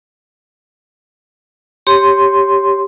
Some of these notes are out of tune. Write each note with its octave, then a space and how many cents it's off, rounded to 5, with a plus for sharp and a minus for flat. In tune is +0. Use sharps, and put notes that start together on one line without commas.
G4 +0 C#5 +0 C6 +0